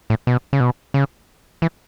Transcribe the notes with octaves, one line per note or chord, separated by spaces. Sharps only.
A2
B2
C#3
B2
C#3
E3